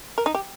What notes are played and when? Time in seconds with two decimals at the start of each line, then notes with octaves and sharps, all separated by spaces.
0.18 A#4
0.26 D#4
0.35 G4